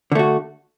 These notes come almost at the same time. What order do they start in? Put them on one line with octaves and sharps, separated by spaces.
D3 A3 F#4